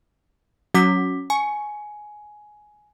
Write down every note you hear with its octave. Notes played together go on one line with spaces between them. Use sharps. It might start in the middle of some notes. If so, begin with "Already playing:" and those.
F#3 C#4 D6 B6
G#5 C#6